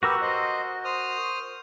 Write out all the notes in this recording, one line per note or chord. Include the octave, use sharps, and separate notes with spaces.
F#4 G4 A#4 B4 E6
C5 D#5
C5 D#6 F6